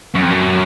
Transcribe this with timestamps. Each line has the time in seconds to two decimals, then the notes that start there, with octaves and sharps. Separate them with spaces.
0.15 F#2
0.23 F2
0.31 F#2